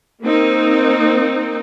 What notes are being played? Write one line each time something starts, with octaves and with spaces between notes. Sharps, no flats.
A#3 C4 D#4